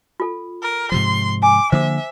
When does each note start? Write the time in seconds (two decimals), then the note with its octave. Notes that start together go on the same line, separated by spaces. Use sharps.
0.20 F4 A4
0.62 A#4
0.92 G#2 C3 F3 C6
1.42 G#5 D6
1.72 D3 F3 A#3 C5 E5 D6